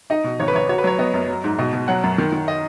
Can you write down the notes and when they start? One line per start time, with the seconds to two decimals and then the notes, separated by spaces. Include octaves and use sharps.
0.10 D#4 D#5
0.24 B2
0.40 G#1 C#5
0.48 B4
0.55 G#1 C#5
0.69 F#4 C#5
0.78 B4
0.84 F#3 C#5
0.98 B3 D#5
1.14 F#2
1.28 F#3
1.44 G#2
1.58 B2 D#5
1.73 B2
1.88 F#3 F#5
2.04 F#2
2.18 D#3
2.32 D#3
2.48 D#5